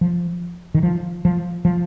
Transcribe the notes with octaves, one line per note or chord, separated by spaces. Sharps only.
F3
D#3
F3
F3
F3